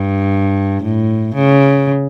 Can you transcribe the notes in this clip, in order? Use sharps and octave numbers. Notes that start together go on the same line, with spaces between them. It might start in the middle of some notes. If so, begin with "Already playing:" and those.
Already playing: G2
A2
C#3